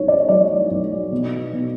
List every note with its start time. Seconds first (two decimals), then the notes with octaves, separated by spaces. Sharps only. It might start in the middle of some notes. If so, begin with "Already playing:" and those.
Already playing: B1 C#4 C#5
0.08 D5
0.29 F#3 D5
0.70 B1
1.12 B2
1.53 B2